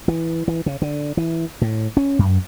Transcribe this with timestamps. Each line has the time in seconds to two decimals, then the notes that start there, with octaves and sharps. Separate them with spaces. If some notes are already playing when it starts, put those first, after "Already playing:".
0.08 E3
0.48 E3
0.66 C#3
0.82 D3
1.17 E3
1.62 A2
1.97 C#4
2.19 F#2